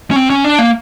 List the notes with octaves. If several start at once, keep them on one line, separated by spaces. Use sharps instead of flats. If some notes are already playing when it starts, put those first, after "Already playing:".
C#4
C4
C#4
D4
A#3